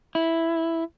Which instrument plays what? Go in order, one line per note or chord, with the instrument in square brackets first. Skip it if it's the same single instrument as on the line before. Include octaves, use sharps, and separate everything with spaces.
[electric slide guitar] E4